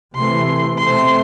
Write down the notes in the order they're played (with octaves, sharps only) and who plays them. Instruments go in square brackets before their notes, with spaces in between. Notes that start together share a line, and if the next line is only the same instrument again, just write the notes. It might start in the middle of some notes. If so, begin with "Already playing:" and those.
[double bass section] C3 E3 A3 [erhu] C6
[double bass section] B2 A3 C4 [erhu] C6